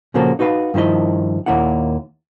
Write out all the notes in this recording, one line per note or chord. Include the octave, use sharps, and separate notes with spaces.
A#2 C#3 F3 A#3 F#4 A4
D#4 F#4 B4 C5 F5
G2 D#3 F3 E4 D#5
D#2 A#2 A#3 E4 F#5